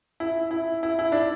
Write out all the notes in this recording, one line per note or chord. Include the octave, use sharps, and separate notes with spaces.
E4
E4
E4
E4
D4